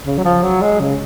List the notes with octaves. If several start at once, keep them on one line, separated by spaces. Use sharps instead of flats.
C#3
F#3
F3
F#3
G#3
C#3